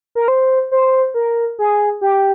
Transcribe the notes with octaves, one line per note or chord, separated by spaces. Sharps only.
A#4
C5
C5
A#4
G#4
G4